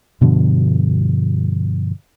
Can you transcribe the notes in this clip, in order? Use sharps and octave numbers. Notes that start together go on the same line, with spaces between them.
G2 B2 D3 F3